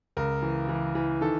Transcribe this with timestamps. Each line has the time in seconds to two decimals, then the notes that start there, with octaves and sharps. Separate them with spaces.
0.17 C#2 A#4
0.42 E3
0.69 E3
0.95 E3
1.21 D#3 A4